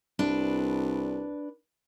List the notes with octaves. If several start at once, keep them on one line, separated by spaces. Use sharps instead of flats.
C2 D4 B4